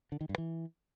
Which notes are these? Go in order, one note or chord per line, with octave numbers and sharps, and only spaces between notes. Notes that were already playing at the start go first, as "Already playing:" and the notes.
D3
D#3
G2
E3